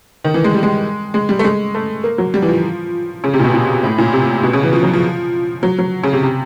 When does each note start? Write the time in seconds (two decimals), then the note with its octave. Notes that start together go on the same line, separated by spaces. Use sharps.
0.24 D#3
0.34 E3
0.44 G#3
0.54 G3
0.63 G#3
1.14 G#3
1.29 G3
1.39 A3
1.44 G#3
1.75 A3
2.04 A#3
2.18 F#3
2.34 G3
2.42 E3
2.48 F3
3.24 C#3
3.33 C3
3.39 A#2
3.44 B2
3.53 A#2
3.83 A2
3.98 A#2
4.13 C3
4.43 B2
4.53 C#3
4.63 E3
4.73 F3
4.83 F#3
4.93 F3
5.63 F#3
5.79 F#3
6.04 C#3
6.13 C3
6.23 C3